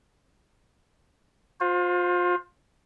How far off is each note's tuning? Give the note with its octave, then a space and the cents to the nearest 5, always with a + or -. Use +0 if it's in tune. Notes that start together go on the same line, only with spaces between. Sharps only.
F4 +30 C5 +0